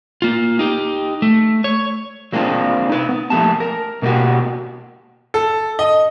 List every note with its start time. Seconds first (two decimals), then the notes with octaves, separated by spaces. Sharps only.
0.22 A#3 F4
0.59 D#4 G4
1.22 A3
1.64 C#5
2.33 F#3 A#3 C4 D4 F4 G#4
2.89 D#4 B4
3.09 B3
3.30 F3 A3 A#3 G4 A5
3.60 A#4
4.02 B2 A#3 C#4 F#4 G4
5.34 A4
5.79 D#5